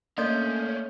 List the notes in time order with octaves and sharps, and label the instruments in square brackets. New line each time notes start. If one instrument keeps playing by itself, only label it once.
[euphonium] A3 [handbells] A#3 G6 [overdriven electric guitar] C#4 D4 [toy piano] D#5